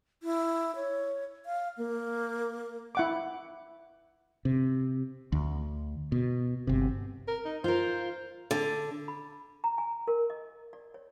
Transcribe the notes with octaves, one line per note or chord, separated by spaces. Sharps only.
E4
C#5
F5
A#3
E4 F#5 D6
C3
D2
B2
G1 C3
A#4
D#4
F4 A#4 C5
D3
B5
A#5
G#5
A#4
D#5
D5
C#5